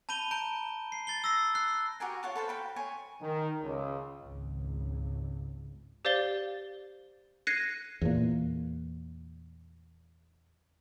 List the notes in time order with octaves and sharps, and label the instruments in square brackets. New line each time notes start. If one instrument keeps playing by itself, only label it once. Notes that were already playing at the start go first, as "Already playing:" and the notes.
[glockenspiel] A5 B5 G6 D#7 G7
A#5 G6 D7
C7
A6 C7 G7
E6 A#6 C7
F#6 C7
[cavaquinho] F#4 G4 A#4 G#5
F4 C#5 F#5 A5
A4 B4 C5 F5
F#4 G5 B5
C#5 G#5 C6
[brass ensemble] D#3
C#2
[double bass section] G#1 C#2
[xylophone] G4 C5 D5 F5 A6 G7
F#6 G#6 A#6 C7 C#7 D#7
[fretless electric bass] E2 A#2